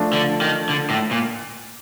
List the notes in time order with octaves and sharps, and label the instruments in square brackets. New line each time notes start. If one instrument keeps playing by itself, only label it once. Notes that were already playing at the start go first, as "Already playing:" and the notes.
Already playing: [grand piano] F3 A3 D4
[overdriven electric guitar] D3
D#3
D3
A2
A#2